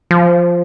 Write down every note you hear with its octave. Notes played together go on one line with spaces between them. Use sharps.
F3